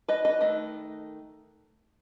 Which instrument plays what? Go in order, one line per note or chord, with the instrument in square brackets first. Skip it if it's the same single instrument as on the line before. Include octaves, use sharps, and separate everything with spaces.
[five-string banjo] B4 D#5
B4 D#5
D#3 A3